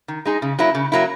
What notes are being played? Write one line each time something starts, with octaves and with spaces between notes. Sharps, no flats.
D#3
G#3 D#4 G#4
C#3
F#3 A#3 E4
C#3
F#3 A#3 E4